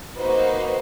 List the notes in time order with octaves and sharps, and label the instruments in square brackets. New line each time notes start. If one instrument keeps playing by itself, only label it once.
[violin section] A#3 D#4 F#4 B4 C5